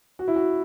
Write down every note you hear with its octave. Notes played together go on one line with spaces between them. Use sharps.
F#4
E4
F#4